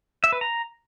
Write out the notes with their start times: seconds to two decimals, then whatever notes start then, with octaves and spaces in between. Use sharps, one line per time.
0.24 E5
0.32 B4
0.41 A#5